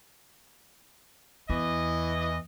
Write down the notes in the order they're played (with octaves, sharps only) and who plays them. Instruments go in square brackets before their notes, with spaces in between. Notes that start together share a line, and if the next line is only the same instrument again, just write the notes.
[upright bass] E2 [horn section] E3 D#5